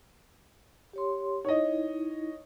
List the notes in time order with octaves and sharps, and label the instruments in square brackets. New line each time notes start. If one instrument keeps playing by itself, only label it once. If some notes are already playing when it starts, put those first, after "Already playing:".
[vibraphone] G4 C#5 C6
[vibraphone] D#4 E4 [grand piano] C#5 D#5